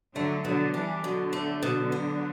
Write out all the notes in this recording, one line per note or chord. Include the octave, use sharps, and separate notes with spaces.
D3 F#3 A3
B2 D3 F#3
E3 G3 D4
B2 D3 F#3
A3
B2
B3